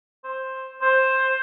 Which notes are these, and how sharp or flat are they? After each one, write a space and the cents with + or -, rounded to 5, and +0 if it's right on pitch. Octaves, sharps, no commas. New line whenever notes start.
C5 +10
C5 +10